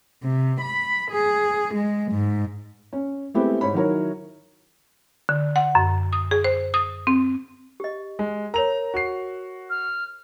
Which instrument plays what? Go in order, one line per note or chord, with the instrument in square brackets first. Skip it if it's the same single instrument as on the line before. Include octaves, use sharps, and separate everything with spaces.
[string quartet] C3
B5
G#4
G#3
G#2
[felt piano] C#4
G#3 A3 B3 C4 E4 G4
G#2 C#5 B5
D#3 F#3 E4 F#4 A#4 C#5
[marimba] D3
F#5
F#2
D#6
G#4
C5
D#6
C4
[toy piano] G4 D#5
[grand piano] G#3
[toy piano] A#4 C#5 [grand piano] A#5 F7
[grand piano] F#4 C7
[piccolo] F6